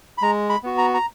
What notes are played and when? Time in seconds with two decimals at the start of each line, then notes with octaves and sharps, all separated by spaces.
0.18 B5
0.22 G#3 A#5
0.50 B5
0.63 B3 F#4
0.78 A#5
0.94 A#5